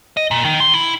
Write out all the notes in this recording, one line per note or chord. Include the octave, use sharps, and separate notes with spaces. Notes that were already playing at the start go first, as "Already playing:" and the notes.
D#5
A#2
D#3
C6
E4